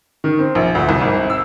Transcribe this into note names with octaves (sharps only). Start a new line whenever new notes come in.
D#3
C4
A#1
D2
C2
G#1
E6